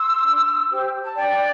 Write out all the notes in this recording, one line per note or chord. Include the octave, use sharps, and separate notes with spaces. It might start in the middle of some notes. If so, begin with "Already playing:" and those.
Already playing: C6 E6
D4
G4 C5
A5
D4 D5 G5